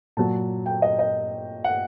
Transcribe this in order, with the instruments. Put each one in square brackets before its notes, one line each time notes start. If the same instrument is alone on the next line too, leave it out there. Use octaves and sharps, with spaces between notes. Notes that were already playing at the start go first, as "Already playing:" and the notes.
[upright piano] A#2 F#3 A5
G5
D#5
D#5
F#5